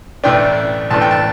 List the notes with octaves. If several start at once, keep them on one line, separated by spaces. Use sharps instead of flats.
A1 A2 E3 A3 D4 G5
A1 A2 E3 A3 D4 A5
G5
A5